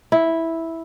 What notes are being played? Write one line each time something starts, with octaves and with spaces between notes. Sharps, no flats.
E4